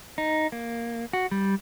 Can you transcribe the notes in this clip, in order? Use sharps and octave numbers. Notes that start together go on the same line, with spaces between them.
D#4
A#3
F#4
G3